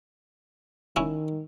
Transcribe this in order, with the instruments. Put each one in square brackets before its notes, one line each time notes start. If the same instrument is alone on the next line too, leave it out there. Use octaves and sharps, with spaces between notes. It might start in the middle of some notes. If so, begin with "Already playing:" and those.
[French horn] D#3 [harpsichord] C#4 E4